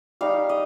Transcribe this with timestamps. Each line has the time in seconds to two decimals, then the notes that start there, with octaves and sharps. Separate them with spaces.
0.21 G3 D#4 F5
0.49 D#5